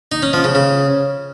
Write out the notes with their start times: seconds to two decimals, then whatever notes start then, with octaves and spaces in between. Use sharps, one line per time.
0.12 D#4
0.22 C#4
0.33 F3
0.44 C#3
0.55 C#3